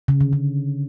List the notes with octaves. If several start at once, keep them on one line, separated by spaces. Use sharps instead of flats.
C#3
D3
C#3